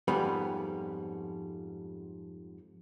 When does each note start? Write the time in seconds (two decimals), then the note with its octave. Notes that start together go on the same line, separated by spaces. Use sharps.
0.08 F2 G#2 G3 B3 C#4 B5